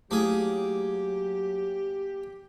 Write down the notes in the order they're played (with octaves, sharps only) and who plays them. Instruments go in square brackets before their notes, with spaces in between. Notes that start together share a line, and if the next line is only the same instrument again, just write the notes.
[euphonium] F#3 [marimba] A3 E4 [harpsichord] A#3 G#4 [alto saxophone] G4